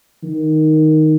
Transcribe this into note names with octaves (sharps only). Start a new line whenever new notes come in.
D#3